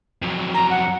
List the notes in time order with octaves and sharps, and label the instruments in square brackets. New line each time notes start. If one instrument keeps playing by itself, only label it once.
[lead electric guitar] F2 F#3
[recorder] A#5
F#5